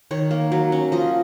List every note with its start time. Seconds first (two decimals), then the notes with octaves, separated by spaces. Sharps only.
0.11 D#3 C#5
0.31 A#3
0.52 F#3
0.72 C#4
0.92 F3 D#5